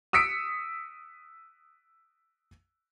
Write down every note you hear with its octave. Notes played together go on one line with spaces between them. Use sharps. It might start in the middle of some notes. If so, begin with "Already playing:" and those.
D#6 E6 B6 C#7 D7